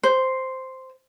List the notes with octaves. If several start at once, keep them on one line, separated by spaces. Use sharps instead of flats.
C5